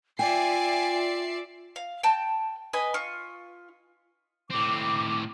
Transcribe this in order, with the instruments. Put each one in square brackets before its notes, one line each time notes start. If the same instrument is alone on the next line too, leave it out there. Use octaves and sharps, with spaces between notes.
[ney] F4 [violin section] D5 E5 C7 [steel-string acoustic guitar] G5 [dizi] G#5
[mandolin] F5
G5 A5 G6
B4 D#5 G#5 B5
F4 C#6
[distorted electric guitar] A2 C4 [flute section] D6